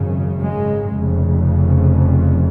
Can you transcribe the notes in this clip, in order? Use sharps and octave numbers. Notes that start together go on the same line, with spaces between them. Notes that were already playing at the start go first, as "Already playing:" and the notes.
Already playing: G#1 F#2 C#3
G#3
F1 F2 C#3